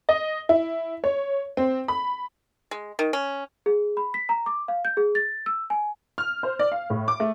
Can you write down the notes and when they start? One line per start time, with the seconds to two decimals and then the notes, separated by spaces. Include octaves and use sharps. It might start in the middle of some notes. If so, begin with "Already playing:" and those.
0.09 D#5
0.49 E4
1.04 C#5
1.57 C4
1.88 B5
2.71 G#3
2.99 D#3
3.13 C#4
3.66 G#4
3.97 B5
4.14 B6
4.29 A#5
4.46 D6
4.68 F5
4.85 G6
4.97 G#4
5.15 A6
5.46 E6
5.70 G#5
6.18 F6
6.43 C5
6.59 D5
6.72 F5
6.90 A2
7.08 D6
7.20 A3